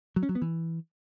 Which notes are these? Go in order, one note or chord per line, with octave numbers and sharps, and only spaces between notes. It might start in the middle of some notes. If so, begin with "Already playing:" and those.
F#3
C#4
F#3
B3
E3